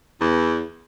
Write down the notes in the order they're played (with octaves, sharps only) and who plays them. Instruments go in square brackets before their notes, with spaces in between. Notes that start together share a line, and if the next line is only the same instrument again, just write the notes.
[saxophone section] E2